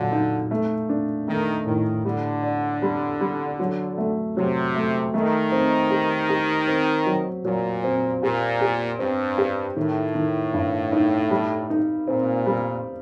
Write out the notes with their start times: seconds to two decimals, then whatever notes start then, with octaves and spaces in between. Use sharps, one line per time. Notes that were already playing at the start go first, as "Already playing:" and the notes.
Already playing: A#2 D3 F#3
0.12 D#4
0.51 A3
0.89 D4
1.28 D#3 A3
1.66 A2 D#3
2.05 D3 G3
2.43 D5
2.82 G3
3.21 G3
3.60 F#3
3.98 A3
4.37 C3 F#3
4.76 A3
5.14 D#3 A3
5.52 C4
5.90 G4
6.29 G4
6.68 C4
7.06 F#3
7.45 A#2 F#3
7.84 C4
8.22 A#2 G4
8.61 G4
8.99 G2 C4
9.38 G4
9.76 A2 D#3
10.15 D#3
10.53 G2
10.92 D#4
11.31 G3
11.70 D#4
12.08 A#2 C4
12.46 G3